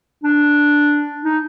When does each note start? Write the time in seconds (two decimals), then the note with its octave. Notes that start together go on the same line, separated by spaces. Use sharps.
0.24 D4
1.24 D#4